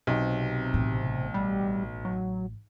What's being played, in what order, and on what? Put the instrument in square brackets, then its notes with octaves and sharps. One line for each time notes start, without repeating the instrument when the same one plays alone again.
[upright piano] B1 [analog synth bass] C3
[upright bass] A1 A2
[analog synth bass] G3
F#3